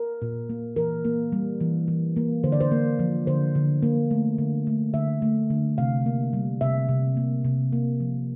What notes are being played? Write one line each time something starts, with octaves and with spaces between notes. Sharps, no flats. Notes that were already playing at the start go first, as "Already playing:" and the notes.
Already playing: A#4
A#2
A#3
E3 A#4
A#3
G3
E3
E3
A#3
D3 C5
D5
C5
A#3
F3
D3 C5
D3
A#3
A3
D3
A3
D3 E5
A3
D3
C3 F5
A#3
G3
C3 E5
C3
A#3
C3
A#3
F3